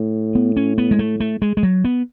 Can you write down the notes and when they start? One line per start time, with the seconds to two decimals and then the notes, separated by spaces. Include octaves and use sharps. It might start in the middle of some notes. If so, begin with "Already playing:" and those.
Already playing: A2
0.35 B3
0.57 C#4
0.78 B3
0.91 G#3
0.99 A3
1.20 A3
1.42 G#3
1.57 G#3
1.63 F#3
1.84 B3